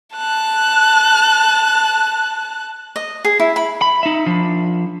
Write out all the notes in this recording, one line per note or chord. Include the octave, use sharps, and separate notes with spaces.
A5 F#6
D#5
G#4
E4
B5
B5
D#4 E5
F3 D4